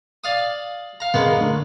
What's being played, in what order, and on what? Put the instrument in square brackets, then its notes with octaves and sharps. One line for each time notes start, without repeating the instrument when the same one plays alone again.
[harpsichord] D5 F5 D#6
F5 A#5
[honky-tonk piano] F#1 A#4 [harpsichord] G#3 A#3 B3
[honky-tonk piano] D3 A3